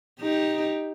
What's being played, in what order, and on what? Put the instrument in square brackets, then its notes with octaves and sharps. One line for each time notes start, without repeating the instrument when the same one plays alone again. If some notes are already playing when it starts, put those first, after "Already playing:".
[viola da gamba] D#4 G4